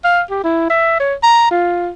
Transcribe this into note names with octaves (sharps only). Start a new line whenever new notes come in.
F5
G4
E4
E5
C#5
A#5
F4